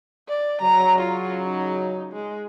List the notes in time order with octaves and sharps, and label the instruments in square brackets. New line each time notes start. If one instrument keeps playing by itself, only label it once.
[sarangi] D5
[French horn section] C#3 F#3 [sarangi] A#5
[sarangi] F4
D#4
G#3